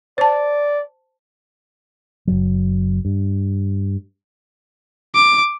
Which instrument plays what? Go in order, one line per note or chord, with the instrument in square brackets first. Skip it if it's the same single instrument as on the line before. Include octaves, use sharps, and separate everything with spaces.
[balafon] C5 A5 [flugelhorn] D5
[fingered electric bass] F#1 F#3
G2
[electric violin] D6